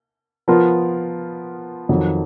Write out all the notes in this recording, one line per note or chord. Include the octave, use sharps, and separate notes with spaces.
F3 B3 F4 A#4
F2 D#3 F#3